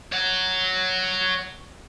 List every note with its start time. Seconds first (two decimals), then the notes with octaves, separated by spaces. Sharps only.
0.12 C#5 F#5